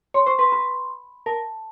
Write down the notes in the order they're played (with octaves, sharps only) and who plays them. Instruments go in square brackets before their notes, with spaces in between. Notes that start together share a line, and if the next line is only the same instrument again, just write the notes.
[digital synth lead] C#5 [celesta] C6
[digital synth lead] C5 [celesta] C#6
[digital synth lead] B4 [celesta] C6
[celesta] B5
[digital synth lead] A#4 [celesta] A5